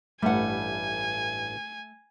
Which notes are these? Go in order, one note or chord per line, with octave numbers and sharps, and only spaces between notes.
A1 G2 G3 A3 F#5 G#5